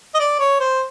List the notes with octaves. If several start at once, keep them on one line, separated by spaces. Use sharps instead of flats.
D#5
D5
C#5
C5